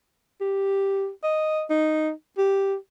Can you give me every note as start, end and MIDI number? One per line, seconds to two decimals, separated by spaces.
0.41 1.10 67
1.24 1.63 75
1.70 2.11 63
2.38 2.76 67